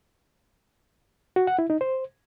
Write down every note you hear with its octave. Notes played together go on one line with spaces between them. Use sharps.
F#4
F#5
E4
D#4
C5